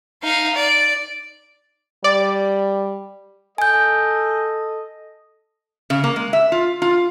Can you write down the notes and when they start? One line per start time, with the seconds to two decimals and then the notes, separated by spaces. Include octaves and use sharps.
0.23 D#4 F5
0.55 D5
2.04 G3 D5
3.58 A4 D#5 G#5 G6
5.90 C#3
6.04 A#3
6.16 G#3
6.33 E5
6.52 F4
6.82 F4